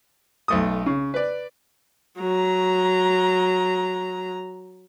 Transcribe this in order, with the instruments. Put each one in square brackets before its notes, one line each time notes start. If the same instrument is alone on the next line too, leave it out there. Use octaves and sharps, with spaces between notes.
[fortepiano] B1 A3 D#6
C#3
B4 D5
[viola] F#3 A#5